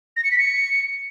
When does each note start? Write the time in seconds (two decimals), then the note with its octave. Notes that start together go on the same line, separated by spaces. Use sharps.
0.17 A#6
0.24 C#7
0.31 B6
0.39 C#7